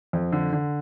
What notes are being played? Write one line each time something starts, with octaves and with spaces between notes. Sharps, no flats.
F2
D3
D3